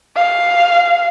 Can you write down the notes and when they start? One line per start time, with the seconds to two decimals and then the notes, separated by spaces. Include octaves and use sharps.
0.16 F5